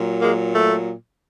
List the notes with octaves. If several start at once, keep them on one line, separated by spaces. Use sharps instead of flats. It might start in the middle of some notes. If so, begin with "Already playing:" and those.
Already playing: A#2 F#3
G#3 A#3
A3